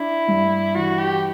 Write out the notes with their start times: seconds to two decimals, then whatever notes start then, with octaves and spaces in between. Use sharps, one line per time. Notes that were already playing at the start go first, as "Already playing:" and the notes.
Already playing: D4 E4
0.28 G2
0.75 E3 F#4
0.99 G4